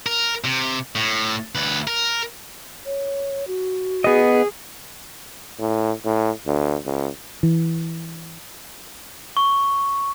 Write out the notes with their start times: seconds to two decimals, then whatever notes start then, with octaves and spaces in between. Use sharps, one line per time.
0.06 A#4
0.44 C3
0.96 A2
1.55 D2 B4
1.87 A#4
2.85 C#5
3.47 F#4
4.04 B3 G#4 D#5
5.59 A2
6.05 A2
6.47 D2
6.85 C#2
7.43 E3
9.37 C#6